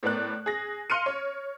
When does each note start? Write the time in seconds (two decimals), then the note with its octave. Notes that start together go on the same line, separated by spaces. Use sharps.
0.03 A2 B3 A#4 D5 F#6
0.46 G#4 A#6
0.90 F5 C6 F6 C#7 D#7
1.06 C#5